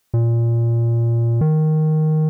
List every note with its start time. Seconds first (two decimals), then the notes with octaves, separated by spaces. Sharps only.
0.14 A#2
1.41 D#3